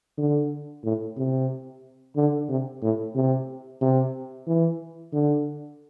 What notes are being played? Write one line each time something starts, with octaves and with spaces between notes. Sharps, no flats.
D3
A2
C3
D3
C3
A2
C3
C3
E3
D3